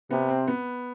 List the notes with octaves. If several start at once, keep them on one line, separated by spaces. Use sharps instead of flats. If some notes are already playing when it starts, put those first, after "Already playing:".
C3 B3
C4
B3